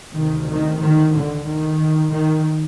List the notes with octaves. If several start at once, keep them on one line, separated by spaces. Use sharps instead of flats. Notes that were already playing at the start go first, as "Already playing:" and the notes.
D2 C3 D#3
D#3
D#3
D3
D#3
D#3